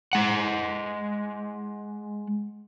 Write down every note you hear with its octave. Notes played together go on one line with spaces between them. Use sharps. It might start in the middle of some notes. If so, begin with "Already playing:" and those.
G#3 F#5